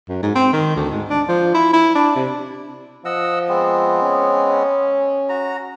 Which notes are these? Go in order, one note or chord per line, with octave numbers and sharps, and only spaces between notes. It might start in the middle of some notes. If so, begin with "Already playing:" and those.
F#2
G#2
C4
D#3
D2
G#2
D4
F3
E4
E4
D4
C3
F3 D#5 F#5 E6
G#3 B3 C4
C#4
F#4 A#5